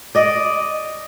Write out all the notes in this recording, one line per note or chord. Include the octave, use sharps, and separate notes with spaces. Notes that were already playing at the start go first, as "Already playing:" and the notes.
D5 D#5